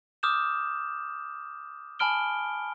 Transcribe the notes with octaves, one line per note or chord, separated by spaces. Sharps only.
D6 D#6 F6 G6 E7
G#5 A5 B5 F6 D7 G7